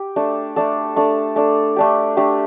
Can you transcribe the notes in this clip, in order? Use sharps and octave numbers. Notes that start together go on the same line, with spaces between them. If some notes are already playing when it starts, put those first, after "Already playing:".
Already playing: G4
A3 D4 A4
A3 D4 A4
A3 D4 A4
A3 D4 A4
A3 D4 G4
A3 D4 G4